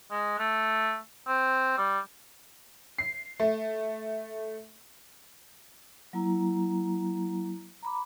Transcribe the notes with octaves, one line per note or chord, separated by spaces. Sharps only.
G#3
A3
C4
G3
C7
A3
F#3 A#3 E4 A#5
A#5 B5 D6